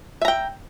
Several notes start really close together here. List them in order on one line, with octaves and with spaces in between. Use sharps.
E5 A#5 G5